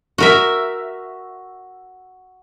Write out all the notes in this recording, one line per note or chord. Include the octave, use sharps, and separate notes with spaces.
F#4 A#4 E5